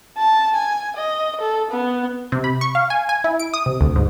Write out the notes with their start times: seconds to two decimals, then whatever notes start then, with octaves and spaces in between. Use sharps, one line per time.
0.18 A5
0.55 G#5
0.96 D#5
1.41 A4
1.71 B3
2.32 C3
2.44 B5
2.61 C#6
2.75 F5
2.90 G#5
3.09 G#5
3.24 E4
3.39 D7
3.54 D#6
3.66 C3
3.81 D2
3.96 G#2